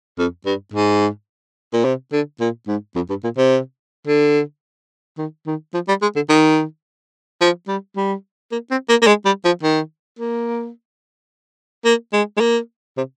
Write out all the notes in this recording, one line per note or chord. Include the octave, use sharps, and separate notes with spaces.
F2
G2
G#2
A#2
C3
D3
A#2
G#2
F2
G2
A#2
C3
D3
D#3
D#3
F3
G3
G#3
D3
D#3
F3
G3
G3
A#3
C4
A#3
A#3
G#3
G3
F3
D#3
A#3
A#3
G#3
G#3
A#3
C3